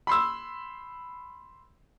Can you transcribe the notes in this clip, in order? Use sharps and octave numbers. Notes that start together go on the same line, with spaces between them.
B5 C6 E6